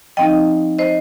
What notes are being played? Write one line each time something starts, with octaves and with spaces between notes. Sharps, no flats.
F3 C4 D#4 D#5 G5
C5 D#5